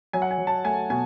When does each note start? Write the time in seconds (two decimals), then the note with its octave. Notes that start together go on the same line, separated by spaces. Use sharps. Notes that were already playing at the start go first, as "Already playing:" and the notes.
0.13 F#3 G#5
0.22 F#5
0.31 G#5
0.38 F#3
0.47 A5
0.64 A3 G#5
0.90 B2 G#5